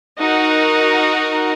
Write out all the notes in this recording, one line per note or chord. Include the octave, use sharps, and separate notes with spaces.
D#4 F#4 A#4 F#5